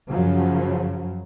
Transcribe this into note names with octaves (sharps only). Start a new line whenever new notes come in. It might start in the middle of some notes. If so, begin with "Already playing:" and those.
F#2 C#3 F3 F#3